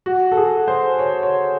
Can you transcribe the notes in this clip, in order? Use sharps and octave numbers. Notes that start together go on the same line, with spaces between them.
F#4
A4
G#4
C5
C#5
C#5